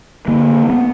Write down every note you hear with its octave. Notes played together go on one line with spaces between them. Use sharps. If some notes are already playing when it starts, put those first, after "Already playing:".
D3 A#3
B3